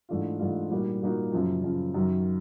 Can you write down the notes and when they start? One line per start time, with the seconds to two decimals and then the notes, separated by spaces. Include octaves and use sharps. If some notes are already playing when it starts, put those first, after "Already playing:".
0.09 G#2 E3 A3 D4 F4
0.39 G#2 E3 A3 D4 F4
0.70 A#2 G3 A#3 D#4 F#4
1.02 A#2 G3 A#3 D#4 F#4
1.32 F#2 C#3 F3
1.64 F#2 C#3 F3
1.94 F#2 D#3 F#3